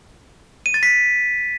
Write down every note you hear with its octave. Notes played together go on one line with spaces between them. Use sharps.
D#7
A6
B6